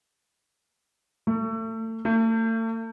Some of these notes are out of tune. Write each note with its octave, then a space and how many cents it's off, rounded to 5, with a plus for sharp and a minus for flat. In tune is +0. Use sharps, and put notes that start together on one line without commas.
A3 +30
A3 +40